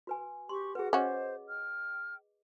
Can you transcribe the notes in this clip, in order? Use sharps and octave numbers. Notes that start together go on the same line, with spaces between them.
F#4 B4 G#5
G4 C6 C#6
F#4 G#4 B4 F#5
C#4 F#4 C5 D#5 D6
G5 F6